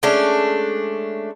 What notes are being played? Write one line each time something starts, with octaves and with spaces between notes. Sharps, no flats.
G#3 A3 C#4 D4